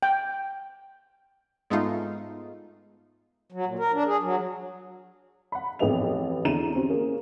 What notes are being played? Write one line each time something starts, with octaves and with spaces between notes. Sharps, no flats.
G5
G#2 G#3 A3 B3 D#4 F4
F#3
A#2
A#4
D4
G#4
F#3
F#5 B5
A1 F2 B3 G#4 D#5 F7
E2 D3 E4 A#5 D#7 E7
C4 C#4 F#4 G4
A#3 C#4 G#4